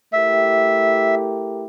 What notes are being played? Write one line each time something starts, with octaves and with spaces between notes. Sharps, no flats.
A3 E4 G4 A#4 E5